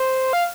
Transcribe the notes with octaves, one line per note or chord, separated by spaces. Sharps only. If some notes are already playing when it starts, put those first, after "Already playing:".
Already playing: C5
F5